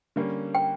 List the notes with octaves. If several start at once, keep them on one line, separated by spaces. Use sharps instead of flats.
D3 G3 A#3 C#4
G5